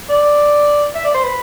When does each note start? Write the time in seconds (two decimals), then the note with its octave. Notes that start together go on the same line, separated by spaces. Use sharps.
0.09 D5
0.95 E5
1.04 D5
1.14 C5
1.24 B4